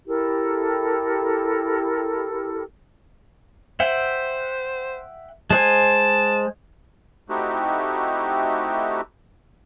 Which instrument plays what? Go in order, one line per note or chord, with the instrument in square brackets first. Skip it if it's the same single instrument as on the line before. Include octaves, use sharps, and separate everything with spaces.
[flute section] E4 G4 A4 A#4
[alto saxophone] C5 [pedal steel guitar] E5 F#5 G5
[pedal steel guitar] G#3 C5 G#5 [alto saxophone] A5
[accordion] A3 C4 D#4 E4 F#4 G4